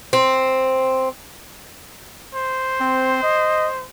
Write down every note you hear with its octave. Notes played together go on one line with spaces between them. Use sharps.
C4
C5
C4
D#5